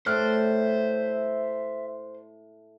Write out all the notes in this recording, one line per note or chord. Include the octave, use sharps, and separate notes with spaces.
A2 C5 D5 E5 F6 F#6